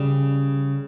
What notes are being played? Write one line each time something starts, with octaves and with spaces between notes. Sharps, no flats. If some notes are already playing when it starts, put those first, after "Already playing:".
Already playing: C#3 G3